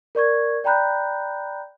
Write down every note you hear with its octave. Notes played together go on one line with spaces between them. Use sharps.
A#4 D5 C#6 G#6
D5 G5 A#5 B5 F#6 G6